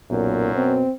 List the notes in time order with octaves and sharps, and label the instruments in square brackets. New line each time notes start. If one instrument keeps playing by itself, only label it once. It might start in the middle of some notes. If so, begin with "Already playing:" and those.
[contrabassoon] B1 [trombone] F#2 [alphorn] A#2
[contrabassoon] B2 [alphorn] C4